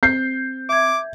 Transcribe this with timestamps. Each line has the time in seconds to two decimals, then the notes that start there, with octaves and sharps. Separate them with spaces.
0.03 C4 G6 C7
0.69 E5 D6 G#6